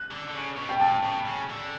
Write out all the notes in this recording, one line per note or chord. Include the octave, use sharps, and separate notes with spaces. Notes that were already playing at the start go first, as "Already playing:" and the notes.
Already playing: F#6
D3
D3
C#3
B2
G5
A2 A5
B2
C#3
D3